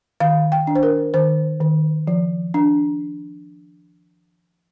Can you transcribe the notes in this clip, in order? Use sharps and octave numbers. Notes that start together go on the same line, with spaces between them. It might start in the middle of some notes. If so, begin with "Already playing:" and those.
D#3 F5
G5
D4
C5
A#4
D#3 C5
D#3
F3
D4